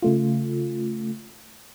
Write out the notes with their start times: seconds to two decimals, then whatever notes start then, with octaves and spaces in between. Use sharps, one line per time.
0.03 C#3 A3 F4